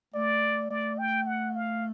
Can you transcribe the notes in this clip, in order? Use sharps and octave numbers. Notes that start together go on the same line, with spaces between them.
A3 D5
A3 D5
G5
F#5
F5